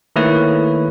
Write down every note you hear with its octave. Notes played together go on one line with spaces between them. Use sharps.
D#3 A3 A#3 E4 B4 C#5